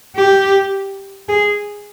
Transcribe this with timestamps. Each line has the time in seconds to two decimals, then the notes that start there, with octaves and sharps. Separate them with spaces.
0.16 G4
1.29 G#4